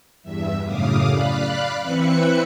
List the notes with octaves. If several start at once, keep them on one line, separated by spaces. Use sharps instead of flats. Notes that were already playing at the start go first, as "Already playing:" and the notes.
E2 G2 E5
F#2 A2 C#3 F5 D6 D#6
D5 F5 B5 F#6
E3 C4 B4 E5 F#6 C#7